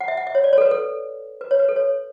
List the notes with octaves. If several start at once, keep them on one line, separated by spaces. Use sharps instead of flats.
F#5
E5
F#5
E5
C#5
D5
C#5
A4
B4
A4
B4
C#5
B4
A4
C#5